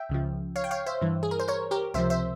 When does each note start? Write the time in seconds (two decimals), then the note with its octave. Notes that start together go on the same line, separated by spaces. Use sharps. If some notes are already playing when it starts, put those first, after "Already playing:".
Already playing: E5 G5
0.09 C#2 C#3 F3
0.56 C#5 F5
0.64 G5
0.71 C#5 F5
0.86 C5 E5
1.01 G2 E3
1.23 G#4
1.31 A#4
1.39 C5
1.48 A#4 C#5
1.71 G4 A#4
1.94 C#2 C3 F3 C5 E5
2.10 C5 E5